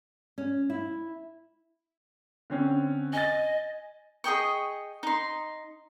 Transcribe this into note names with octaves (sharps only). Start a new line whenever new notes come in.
C#4
E4
D3 C4 C#4
D#5 G#5 A6
G#4 D#5 G5 C#6
D#4 C6